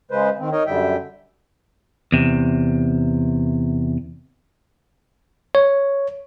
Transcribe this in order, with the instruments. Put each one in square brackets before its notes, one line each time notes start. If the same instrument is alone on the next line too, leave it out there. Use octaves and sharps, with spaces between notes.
[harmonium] C#3 G#3 B4 C5
D#3 C4
D#4 A#4 C#5 D#5
F#2 D3 G3 E5 G5
[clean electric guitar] E2 C3
[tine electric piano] C#5